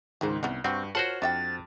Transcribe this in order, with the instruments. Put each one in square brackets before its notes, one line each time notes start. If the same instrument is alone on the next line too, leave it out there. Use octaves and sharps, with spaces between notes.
[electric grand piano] C#2 G#2 D#3 [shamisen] D3 G#4 C5
[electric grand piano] C2 [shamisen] B3 C#4 D#4
[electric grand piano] G2 C#6 [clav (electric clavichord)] C4 [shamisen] F#4 G4
[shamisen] F4 A#4 A5 [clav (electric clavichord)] F#4 C5 F#5 [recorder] C#5 [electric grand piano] F6
[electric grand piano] F2 [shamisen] D4 E5 G5 [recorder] A6